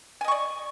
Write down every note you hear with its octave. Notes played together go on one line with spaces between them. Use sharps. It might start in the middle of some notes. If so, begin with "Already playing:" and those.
D5 D#5 G#5 C#6